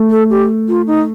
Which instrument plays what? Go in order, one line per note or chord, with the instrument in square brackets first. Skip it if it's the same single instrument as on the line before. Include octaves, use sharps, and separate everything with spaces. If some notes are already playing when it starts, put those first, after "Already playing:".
Already playing: [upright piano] A3
[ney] A4
G4
F4
D#4